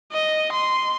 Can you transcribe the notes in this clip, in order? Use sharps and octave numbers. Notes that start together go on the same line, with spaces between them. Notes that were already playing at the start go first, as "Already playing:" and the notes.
D#5
C6